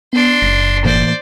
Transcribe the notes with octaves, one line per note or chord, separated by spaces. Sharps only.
B3 D4 C6
F#1 A#6
A2 E3 A#3 C5 D5